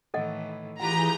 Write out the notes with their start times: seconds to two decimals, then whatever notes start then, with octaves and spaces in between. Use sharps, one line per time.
0.14 A2 D#3 E3 A4 D#5 F#5
0.80 E3 F4 G4 G#4 B4 F#5 A#5 G6